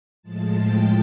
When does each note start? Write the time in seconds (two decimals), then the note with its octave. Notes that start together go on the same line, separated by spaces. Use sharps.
0.22 A2 F3 G#3 A5
0.57 G5